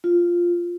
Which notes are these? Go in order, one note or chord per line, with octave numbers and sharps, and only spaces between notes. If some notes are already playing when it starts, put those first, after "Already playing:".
F4